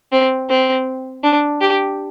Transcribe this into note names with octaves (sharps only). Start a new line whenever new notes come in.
C4
C4
D4
G4